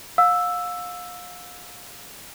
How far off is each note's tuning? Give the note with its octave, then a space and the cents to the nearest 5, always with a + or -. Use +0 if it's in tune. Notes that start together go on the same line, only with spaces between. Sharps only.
F5 +35 E6 +0